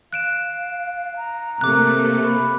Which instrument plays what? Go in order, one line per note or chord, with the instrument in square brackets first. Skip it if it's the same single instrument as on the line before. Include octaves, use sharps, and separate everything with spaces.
[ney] F5 [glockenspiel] F#6 D7 E7
[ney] A#5
[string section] C3 A3 A#3 [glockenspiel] D6 F#6
[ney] B5